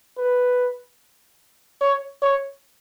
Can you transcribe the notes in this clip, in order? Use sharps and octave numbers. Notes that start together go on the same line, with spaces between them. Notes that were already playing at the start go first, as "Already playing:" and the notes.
B4
C#5
C#5